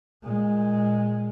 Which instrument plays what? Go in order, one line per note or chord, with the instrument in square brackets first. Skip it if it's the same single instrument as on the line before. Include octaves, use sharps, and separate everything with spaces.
[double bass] A#2 G#3